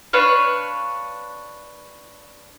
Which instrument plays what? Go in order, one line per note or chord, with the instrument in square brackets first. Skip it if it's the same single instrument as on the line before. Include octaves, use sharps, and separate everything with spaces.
[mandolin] D4 B4 C#5 F5